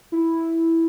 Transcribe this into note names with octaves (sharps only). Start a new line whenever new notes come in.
E4